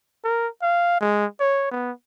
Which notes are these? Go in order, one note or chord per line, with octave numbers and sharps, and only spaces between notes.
A#4
F5
G#3
C#5
B3